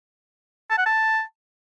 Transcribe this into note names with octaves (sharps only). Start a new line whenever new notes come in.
A5
F#5
A5